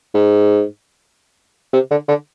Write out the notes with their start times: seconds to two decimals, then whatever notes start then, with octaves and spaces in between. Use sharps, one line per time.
0.14 G#2
1.73 C3
1.90 D3
2.08 D3